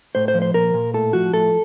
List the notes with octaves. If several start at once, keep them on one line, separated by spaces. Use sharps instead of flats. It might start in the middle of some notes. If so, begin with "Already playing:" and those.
A2 C5
C5
F3
C5
A#2 A#4
A#2
A2 A4
F3 F#4
A2 A4